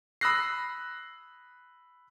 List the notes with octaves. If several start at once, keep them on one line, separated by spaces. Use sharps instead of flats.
B5 D#6 E6 F#6 A#6 C7